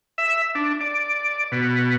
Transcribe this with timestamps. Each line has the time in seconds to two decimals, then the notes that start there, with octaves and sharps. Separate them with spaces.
0.18 E5
0.55 D4
0.81 D5
1.52 B2